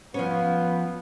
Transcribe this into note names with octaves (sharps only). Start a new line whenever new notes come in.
F3 B3 C#4